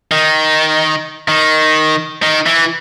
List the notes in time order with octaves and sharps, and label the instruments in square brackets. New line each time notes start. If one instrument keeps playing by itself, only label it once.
[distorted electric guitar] D#3
D#3
D#3
E3